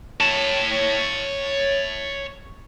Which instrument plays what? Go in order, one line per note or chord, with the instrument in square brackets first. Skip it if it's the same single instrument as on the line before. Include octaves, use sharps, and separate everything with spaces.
[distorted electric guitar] C#5 A5